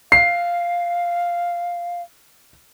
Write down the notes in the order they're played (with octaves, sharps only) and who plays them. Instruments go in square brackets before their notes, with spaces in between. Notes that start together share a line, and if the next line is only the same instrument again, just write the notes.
[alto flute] F5 [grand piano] C7